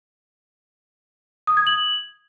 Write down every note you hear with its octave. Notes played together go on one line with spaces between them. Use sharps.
D#6
G#6
F#7